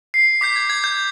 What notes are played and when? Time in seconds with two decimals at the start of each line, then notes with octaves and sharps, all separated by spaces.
0.14 C7
0.41 D6 G6 B6
0.56 G#6
0.70 G#6
0.84 G6